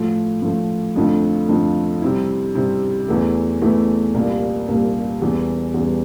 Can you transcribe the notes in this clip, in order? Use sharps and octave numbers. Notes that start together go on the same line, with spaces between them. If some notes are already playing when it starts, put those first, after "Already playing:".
Already playing: A2 F3 A3
A2 F3 A3
F2 D3 F3 A3
F2 D3 F3 A3
C3 G3 C4 E4
C3 G3 C4 E4
E2 E3 A3 E4
E2 E3 A3 E4
C2 A#2 G3 A#3
C2 A#2 G3 A#3
E2 E3 G3
E2 E3 G3